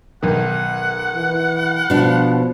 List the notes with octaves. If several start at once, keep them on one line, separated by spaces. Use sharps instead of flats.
B1 D#3 F#5
E3
B2 F3 D4